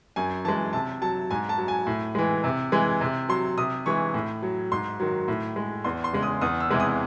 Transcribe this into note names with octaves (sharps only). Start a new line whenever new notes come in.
F#2 G#5
E3 G#3 A5
C3 A5
F#3 A5
G#2 G#5
A5
F#3
G#5
A2
E3 G#3
C3
E3 G#3
C3
F#3 C6
C3 D#6
E3 G#3 C#6
A2
F#3
G#2 C6
D#3 F#3
A2
G#3
E2 C6
C6
C#3 G#3
D#6
E2 D#6
E6
C3 E3 G#3
D#6